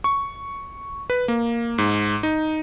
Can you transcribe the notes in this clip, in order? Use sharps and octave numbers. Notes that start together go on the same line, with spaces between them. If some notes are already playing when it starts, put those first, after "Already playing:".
C#6
B4
A#3
G#2
D#4